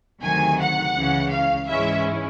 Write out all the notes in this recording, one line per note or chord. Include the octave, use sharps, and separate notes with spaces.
D2 C3 D#3 F#3 G#5
F#5
C#2 C#3 E3
F5
G#2 E3 G#3 C#4 E4 E5